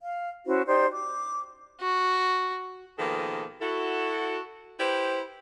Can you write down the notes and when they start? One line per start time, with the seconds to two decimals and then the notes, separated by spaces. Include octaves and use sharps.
0.02 F5
0.46 C#4 E4 F#4 C5
0.66 D#4 G4 C5 D5
0.91 D6
1.81 F#4
2.99 B2 D#3 F3 A#3 G#4 A4
3.61 E4 F#4 A4
4.80 E4 G4 B4 C5